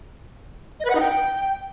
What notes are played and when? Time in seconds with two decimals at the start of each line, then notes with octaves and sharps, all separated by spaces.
0.80 D#5
0.85 B4
0.90 F#5
0.95 D#4
1.00 G5